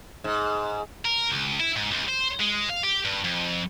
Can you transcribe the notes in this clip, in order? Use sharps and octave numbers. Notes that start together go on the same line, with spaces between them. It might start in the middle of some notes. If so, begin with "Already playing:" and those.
G#2
A#4
C#2
E4
G#2
C#2
C5
G#3
F5
G4
G2
F2